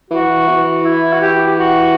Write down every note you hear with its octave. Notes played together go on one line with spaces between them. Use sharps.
E3 F#4
E3
E4
F#4
G4
F#4